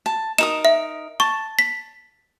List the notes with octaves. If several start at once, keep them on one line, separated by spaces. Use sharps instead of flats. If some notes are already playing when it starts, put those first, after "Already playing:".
A5
D#4 A#4 D#6 E7
E5
A5 C#6
B6